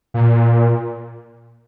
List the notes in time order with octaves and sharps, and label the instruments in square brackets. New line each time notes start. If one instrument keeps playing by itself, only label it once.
[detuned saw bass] A#2